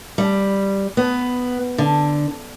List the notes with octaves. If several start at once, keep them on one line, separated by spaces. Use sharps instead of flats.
G3
B3
D3